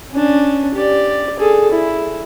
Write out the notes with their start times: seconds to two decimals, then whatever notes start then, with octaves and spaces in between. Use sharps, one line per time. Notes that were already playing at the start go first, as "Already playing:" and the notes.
0.11 C#4 D4
0.75 G4 D5
1.38 G#4 A4
1.71 E4